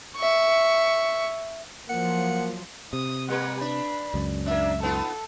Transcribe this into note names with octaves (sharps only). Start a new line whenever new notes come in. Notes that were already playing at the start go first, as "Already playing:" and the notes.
E5 C#6
F3 F#3 A#3 F#5
C3 D#6
G3 A#3 B4 F#5
D4 B5
C#2 F#2
A#3 D4 E5
B3 D#4 F4 A4